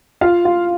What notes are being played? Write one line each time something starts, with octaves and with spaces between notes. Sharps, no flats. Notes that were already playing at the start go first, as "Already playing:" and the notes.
F4 F5
F4